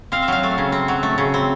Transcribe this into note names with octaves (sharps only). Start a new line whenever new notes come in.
C4 F5
E5
F#3 F5
A3
C#3
C4
F#3
A3
C#3
C4